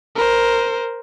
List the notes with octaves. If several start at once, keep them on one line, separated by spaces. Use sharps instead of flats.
A#4 C5